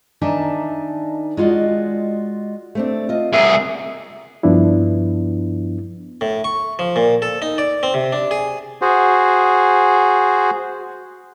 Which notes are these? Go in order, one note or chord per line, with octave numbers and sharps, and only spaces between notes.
D#3 D4 D#4 E5 G#5 A5
G#3 F4 F#4 D5 D#5
A3 C4 D4
F4 D#5
C2 G#4 E5 F#5 A#5
G2 F3 B3 D4 E4
A2
C#6
F3
A#2
A4
D#4
D5
C4
C3
D4
G#4
F#4 G#4 C5